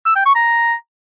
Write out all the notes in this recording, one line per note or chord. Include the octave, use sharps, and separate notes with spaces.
E6
G5
C#6
A#5